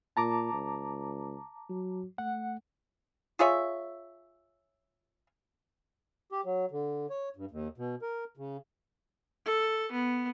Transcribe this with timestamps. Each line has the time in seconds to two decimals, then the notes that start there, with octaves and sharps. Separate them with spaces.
0.17 A#2 A5 A#5 D6
0.53 C#2
1.69 F#3
2.18 A3 F#5
3.39 F4 G#4 C#5 E5
6.32 G4
6.45 F#3
6.71 D3
7.10 C#5
7.36 G2
7.51 D#2
7.78 B2
8.02 A#4
8.37 C#3
9.45 A4
9.92 B3